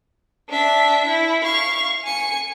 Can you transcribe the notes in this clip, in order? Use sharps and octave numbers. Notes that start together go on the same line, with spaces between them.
D4 E5
E4
F5 C#6
G#5 C#7